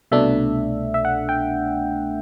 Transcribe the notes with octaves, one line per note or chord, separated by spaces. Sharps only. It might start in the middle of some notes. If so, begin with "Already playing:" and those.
C2 B2 A3 D4 E5
E5
F#5
G5